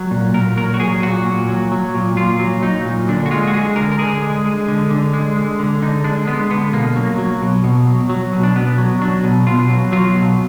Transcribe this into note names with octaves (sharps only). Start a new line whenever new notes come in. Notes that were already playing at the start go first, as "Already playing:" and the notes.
Already playing: F#3
A#2
A#2 A#4
F#3 A#4
F#4
F#3 G#4
A#2 F#4
A#2
F#3
F#3
A#2
A#2 F4
F#3
F#3 D#4
A#2
D3 D4
F#4
G#3 F4
F#4
G#3 G#4
D3 A#4
A#4
D3 G#4
G#3
G#3
D3
D3
G#3
G#3
D3
D3 D#4
G#3 D4
G#3 B3
D3 B3
B2 A#3
F#3
F#3
B2
B2
F#3
F#3
B2
D4
B2 B3
F#3
F#3 D4
B2
B2 F4
F#3
F#3 F4
B2